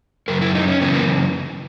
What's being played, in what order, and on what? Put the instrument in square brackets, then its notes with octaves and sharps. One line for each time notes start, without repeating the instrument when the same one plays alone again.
[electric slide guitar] F#2 C#3 A#4
E4
D#4
C#4
F#2 C#3 E3 B3
A#3